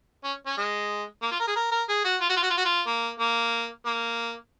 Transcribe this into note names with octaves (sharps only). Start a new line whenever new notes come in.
C#4
C#4
G#3
A#3
F4
A#4
G#4
A#4
A#4
G#4
F#4
F4
F#4
F4
F#4
F4
F#4
F4
A#3
A#3
A#3